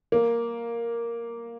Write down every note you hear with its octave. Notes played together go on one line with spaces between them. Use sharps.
A#3